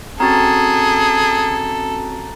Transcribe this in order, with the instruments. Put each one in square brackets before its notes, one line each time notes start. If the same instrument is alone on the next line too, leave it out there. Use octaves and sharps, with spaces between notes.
[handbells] C4 C#4 F#4 [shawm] G#4 [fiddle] A4 [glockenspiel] A#5 A6